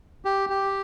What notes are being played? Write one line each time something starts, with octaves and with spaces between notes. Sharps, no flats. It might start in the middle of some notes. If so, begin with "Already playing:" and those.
G4
G4